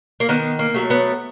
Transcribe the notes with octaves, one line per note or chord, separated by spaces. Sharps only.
A#3
D#3 B3
A#3
F#3 A3
B3